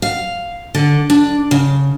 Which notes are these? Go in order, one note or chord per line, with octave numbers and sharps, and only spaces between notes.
F5
D3
D4
C#3